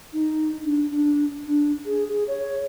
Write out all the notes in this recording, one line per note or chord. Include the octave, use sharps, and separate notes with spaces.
D#4
D4
D4
D4
G#4
G#4
C#5